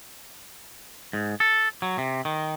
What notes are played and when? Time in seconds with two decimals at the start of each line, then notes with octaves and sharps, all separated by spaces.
1.13 G#2
1.40 A4
1.82 F#3
1.98 C3
2.25 D#3